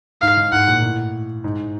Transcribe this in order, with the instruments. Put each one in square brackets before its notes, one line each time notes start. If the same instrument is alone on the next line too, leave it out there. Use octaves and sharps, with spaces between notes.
[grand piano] G#2 [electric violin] F5
[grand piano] G#2
[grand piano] G#2 [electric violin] F#5
[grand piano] A#2
A2
G#2